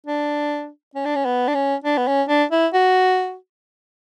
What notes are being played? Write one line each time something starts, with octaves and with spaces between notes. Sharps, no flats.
D4
C#4
D4
C#4
B3
D4
C#4
D4
B3
C#4
D4
E4
F#4